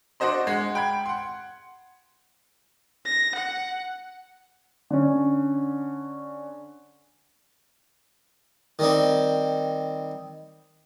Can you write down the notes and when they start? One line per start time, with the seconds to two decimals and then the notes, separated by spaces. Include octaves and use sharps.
0.20 D4 F#4 C5 D#5 C6
0.47 G#3 F#5
0.75 G5 B5 G#6
1.06 F#5 C6
3.05 A#6
3.35 F#5
4.90 D3 C#4
8.79 D#3 G3 C4